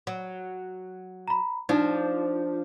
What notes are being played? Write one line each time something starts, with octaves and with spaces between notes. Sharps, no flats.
F#3
A#5 B5
F3 D4 D#4